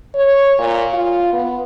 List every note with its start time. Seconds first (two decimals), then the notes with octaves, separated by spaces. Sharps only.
0.15 C#5
0.59 A#2
0.94 F4
1.33 B3